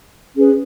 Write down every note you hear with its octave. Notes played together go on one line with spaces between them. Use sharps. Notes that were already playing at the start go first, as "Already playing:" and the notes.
C#4 G#4 B4